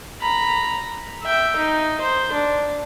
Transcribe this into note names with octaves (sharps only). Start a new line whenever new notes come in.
A#5 B5
E5 G5
D#4
C5
D4